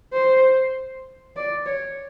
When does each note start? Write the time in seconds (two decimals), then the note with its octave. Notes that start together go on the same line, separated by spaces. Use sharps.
0.13 C5
1.36 D5
1.66 C#5